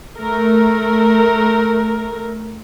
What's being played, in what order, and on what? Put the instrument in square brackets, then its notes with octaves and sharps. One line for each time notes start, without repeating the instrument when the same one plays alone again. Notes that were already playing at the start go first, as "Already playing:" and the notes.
[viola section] A3 A#4